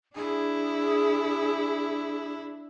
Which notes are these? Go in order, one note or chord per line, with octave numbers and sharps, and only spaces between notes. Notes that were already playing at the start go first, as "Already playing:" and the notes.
D4 E4 G#4